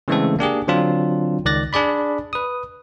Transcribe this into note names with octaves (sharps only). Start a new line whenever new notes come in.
C#3 E3 G#3 A3 C4 A4
A#3 D4 G4 G#4
D3 F#3 C4 D4 F4
C#2 D#3 D5 F#6 A6 A#6
D4 G#4 D5 B5
B4 D#6